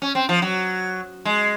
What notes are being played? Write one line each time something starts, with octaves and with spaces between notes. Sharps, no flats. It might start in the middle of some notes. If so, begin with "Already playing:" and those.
C#4
C4
F3
F#3
G#3